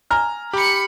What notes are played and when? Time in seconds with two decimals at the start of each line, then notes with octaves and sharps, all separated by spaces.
0.11 G#5 A#5 F6
0.53 G4 B5 C#7